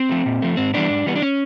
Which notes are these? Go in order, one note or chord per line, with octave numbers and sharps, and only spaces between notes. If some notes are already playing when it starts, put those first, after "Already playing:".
Already playing: C4
F3 A3
A#2
F3 A3
G#2 C4
E3 G3 B3 D4
G#2
E3 G3 B3
D4
C#4